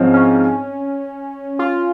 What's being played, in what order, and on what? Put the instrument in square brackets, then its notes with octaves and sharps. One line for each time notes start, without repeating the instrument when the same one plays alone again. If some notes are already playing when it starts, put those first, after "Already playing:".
Already playing: [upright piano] G#2 F3 C4 [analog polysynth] C#4
[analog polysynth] C#4
F4